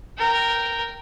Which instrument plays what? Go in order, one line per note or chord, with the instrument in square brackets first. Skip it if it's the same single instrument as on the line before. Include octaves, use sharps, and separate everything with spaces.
[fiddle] A#4 G5